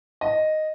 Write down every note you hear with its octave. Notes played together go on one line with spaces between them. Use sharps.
D#5